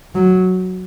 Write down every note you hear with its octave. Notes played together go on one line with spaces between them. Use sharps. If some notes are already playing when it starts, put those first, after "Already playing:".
F#3